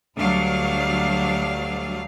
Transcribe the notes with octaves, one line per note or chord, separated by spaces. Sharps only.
D2 F#3 G3 D4 F5